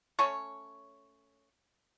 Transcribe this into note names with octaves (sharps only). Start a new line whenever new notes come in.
A3 C#4 C#5 C#6